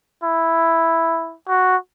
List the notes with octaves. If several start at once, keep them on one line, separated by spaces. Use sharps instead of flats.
E4
F#4